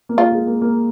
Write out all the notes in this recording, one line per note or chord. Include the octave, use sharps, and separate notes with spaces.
A#3
G#3 F4
G#3
A#3
A#3